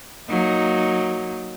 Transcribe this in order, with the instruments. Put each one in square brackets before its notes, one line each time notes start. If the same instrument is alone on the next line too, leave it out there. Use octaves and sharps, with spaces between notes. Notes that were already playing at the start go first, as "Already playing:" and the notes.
[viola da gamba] F#3 A#3 D#4